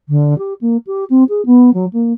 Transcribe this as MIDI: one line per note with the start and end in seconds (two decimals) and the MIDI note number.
0.09 0.37 50
0.38 0.53 67
0.61 0.77 58
0.86 1.04 67
1.10 1.23 60
1.29 1.44 68
1.45 1.73 59
1.73 1.85 54
1.93 2.13 58